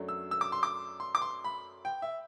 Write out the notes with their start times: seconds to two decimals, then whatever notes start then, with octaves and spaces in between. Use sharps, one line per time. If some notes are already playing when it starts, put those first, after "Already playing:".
Already playing: F#2 F#3 A3 D4
0.08 E6
0.31 E6
0.41 D6
0.52 C6
0.63 D6
1.00 C6
1.15 D6
1.22 C6
1.44 B5
1.85 G5
2.02 E5